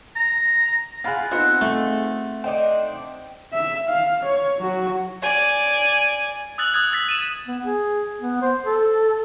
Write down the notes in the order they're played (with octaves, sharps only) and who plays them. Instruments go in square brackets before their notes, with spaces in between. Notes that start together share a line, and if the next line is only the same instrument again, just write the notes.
[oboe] A#5
[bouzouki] E4 G#4 [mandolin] F4 [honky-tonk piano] F#5 B5 F#6
[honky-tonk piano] B3 D#4 F4 [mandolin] C4 F#5
[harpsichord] A3
[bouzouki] D4 D#4 C5 [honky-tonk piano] G5
[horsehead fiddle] E5
F5
C#5
F#3 F#4
[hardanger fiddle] D5 G#5
[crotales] D#6 E6 F#6 A6 F#7
D#6 F#6 G#6
D#6 E6 A6 B6
D#7 E7
[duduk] B3
G#4
B3
C5
A4